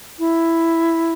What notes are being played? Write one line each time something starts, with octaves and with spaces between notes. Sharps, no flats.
E4